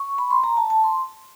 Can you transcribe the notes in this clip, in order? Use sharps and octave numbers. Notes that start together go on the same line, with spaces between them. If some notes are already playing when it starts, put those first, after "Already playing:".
Already playing: C#6
B5
C6
A#5
A5
A5
C6